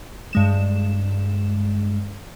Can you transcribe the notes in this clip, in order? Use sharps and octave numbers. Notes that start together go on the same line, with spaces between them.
G2 G#3 E7